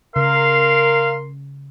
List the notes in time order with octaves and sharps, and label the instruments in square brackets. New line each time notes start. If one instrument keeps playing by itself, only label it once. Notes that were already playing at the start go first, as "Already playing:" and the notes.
[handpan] C#3 [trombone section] A#4 [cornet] F5 [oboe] C6